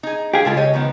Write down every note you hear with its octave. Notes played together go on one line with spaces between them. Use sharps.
D#4 G#4
G4 G#4 F5
C#2 G#3 F4 A4
G4 C#5 D#5
D#3 F3 B3